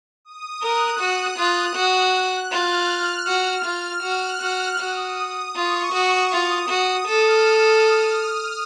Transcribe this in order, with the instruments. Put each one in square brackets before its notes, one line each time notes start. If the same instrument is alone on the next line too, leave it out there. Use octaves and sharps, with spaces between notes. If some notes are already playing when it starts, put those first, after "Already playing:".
[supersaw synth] D#6
[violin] A#4 [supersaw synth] F#6
[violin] F#4
F4
F#4
[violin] F4 [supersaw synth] F6
[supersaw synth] F6
[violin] F#4
F4
[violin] F#4 [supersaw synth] F#6
[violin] F#4
[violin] F#4 [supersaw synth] D#6
[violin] F4 [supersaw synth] C#6
[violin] F#4
[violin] F4 [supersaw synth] D#6
[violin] F#4 [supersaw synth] D#6
[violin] A4 [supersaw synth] F6